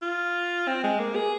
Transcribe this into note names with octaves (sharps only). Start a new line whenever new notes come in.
F4
C4
G#3
A#3
G#4